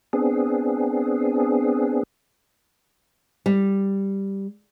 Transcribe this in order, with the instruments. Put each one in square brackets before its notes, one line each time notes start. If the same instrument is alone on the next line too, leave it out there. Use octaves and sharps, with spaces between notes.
[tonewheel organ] B3 C4 D4 G#4
[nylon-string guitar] G3